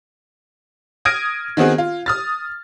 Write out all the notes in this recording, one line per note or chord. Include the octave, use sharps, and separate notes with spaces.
D#6 F6 G#6 A#6 D7 D#7
D#3 B3 C4 F#4 G#4
F4
D#6 F6 A6